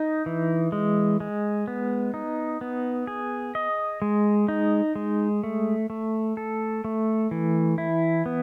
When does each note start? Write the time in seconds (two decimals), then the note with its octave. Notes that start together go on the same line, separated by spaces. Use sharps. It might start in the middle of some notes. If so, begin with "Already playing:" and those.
Already playing: D#4
0.26 E3
0.72 G#3
1.20 G#3
1.68 B3
2.14 D#4
2.61 B3
3.07 G#4
3.55 D#5
4.02 G#3
4.48 D#4
4.95 G#3
5.43 A3
5.90 A3
6.37 A4
6.85 A3
7.31 E3
7.78 E4
8.26 B3